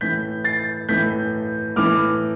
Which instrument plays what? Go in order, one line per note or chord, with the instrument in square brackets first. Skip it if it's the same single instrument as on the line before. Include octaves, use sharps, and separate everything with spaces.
[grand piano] A2 E3 G6 B6
A6 C7
A2 E3 G6 B6
A2 E3 D6 F6